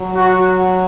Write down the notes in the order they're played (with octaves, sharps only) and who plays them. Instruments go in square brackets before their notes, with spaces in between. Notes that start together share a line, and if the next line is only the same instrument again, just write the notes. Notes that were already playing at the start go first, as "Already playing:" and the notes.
Already playing: [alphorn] F#3
[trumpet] F#4